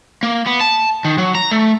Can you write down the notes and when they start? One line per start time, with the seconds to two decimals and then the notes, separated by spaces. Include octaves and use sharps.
0.23 A#3
0.47 B3
0.61 A5
1.05 D#3
1.18 F#3
1.35 A#5
1.51 A3